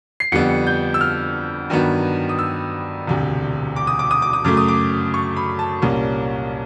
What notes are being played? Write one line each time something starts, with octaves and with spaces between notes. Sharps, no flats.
C7
F2 D3 G3 B3 C#7
G6
E6
F6
G2 D#3 F#3 B3
D#6
E6
E1 D2 C3
D6
D#6
D6
D#6
D6
D#6
F#2 C#3 F#3 A3 D6
D#6
D6
C#6
B5
A5
C2 A#2 G3 A#3 C#4